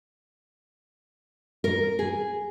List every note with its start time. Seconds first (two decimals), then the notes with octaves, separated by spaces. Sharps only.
1.64 A#4
1.99 G#4